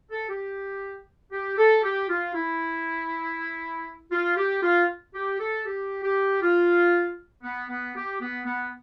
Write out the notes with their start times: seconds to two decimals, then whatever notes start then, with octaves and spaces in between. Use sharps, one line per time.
0.11 A4
0.29 G4
1.32 G4
1.58 A4
1.83 G4
2.09 F4
2.34 E4
4.12 F4
4.37 G4
4.63 F4
5.14 G4
5.40 A4
5.66 G4
6.03 G4
6.42 F4
7.43 B3
7.69 B3
7.96 G4
8.21 B3
8.45 B3